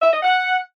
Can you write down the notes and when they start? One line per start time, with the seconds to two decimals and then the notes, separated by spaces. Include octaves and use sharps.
0.01 E5
0.12 D#5
0.23 F#5